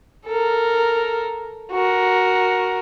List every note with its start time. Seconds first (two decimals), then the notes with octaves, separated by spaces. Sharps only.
0.27 A4 A#4
1.72 F#4 A#4